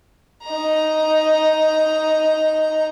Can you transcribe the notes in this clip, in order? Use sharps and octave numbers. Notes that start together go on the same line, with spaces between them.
D#4 A#5